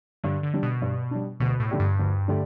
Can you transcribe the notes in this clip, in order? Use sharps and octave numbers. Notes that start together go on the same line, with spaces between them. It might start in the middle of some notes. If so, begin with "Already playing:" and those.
G2 D3
D3
G3 D4
B2
G2
G3 D4
D2 B2
A2
D3 A3 G4 D5
G2
D2
D3 A3 G4 D5